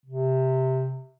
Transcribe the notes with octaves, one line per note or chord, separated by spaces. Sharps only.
C3